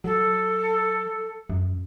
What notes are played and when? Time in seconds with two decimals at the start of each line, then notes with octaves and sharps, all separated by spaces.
0.04 F#3 A4
1.50 F#2